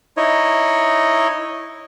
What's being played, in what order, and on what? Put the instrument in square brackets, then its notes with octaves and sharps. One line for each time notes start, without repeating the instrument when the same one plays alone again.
[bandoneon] D#4 E4 C#5 D#5